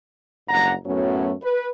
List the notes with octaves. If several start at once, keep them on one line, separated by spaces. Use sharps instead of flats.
F#1 G2 F#5 A#5
F#2 A2 F#3 A3 B3 C#4
B4